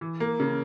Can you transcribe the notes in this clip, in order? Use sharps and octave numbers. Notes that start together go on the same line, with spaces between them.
E3
A#3
C#3